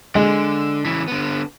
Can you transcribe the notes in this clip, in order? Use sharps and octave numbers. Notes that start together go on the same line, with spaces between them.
D3 G#3
C#3 E3
D3 B3